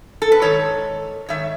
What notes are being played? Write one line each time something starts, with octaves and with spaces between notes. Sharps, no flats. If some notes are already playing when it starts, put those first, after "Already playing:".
A4
B4
G#2 D#3 A4 C#5
G#2 D#3 C#5 E5